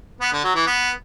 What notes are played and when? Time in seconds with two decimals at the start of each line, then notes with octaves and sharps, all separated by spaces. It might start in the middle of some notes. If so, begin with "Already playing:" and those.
0.21 B3
0.32 D3
0.44 F#3
0.55 E3
0.67 B3